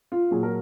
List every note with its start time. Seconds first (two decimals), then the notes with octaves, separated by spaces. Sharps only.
0.12 F4
0.31 A#2 F#3 G#4
0.43 A#4